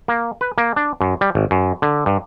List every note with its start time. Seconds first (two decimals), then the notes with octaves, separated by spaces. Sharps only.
0.08 A#3
0.41 B4
0.58 A#3
0.76 D4
1.01 F#2
1.21 G3
1.35 G#1
1.51 F#2
1.82 D3
2.06 G2